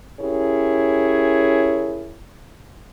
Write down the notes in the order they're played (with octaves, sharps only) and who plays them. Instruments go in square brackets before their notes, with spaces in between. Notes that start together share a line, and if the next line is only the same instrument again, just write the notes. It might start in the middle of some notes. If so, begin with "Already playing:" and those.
[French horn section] C#4 E4 G4 G#4 A#4 C#5